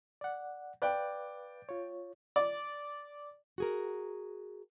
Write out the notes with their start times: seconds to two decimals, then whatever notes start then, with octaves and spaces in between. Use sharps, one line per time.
0.21 D5 F#5
0.82 B4 D5 F5 G5 F#6
1.69 F4 C#5
2.36 D5
3.58 F#4 G#4 A#4